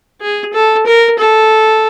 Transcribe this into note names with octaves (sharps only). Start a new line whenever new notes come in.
G#4
A4
A#4
A4